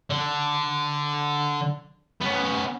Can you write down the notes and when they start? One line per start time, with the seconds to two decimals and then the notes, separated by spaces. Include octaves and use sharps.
0.10 D3
2.21 B3 C#4